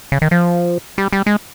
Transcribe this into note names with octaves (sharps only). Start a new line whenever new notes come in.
C#3
D#3
F3
G3
G3
G#3